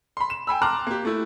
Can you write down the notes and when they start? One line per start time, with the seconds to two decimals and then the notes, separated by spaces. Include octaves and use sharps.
0.17 B5 C6
0.30 E7
0.47 G5 G#5 B5 E6
0.62 A5 A#5 C6 D6 F6 F#6
0.87 A#3 G4
1.05 A3 E4